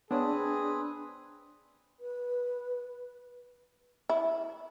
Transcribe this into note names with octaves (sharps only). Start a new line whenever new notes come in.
B3 C4 D4 G#4 B4 C#5 D#6
B4
E4